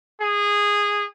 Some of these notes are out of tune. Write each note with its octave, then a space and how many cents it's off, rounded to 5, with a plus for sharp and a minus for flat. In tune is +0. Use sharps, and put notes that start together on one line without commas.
G#4 -15